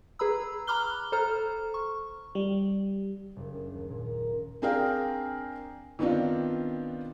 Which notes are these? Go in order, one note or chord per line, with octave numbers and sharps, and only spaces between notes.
G#4 B4 A#5 B5 E6
A#5 B5 D6 F6 F#6 G7
A4 C5 A#5 F6
C#6
G3
F#1
D4
D#2
A#2
A#5
C4 D4 G#4 A#4 F5 G5
D#3 B3 C4 D4 F4